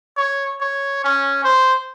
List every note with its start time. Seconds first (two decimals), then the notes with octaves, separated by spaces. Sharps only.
0.17 C#5
0.61 C#5
1.04 C#4
1.44 C5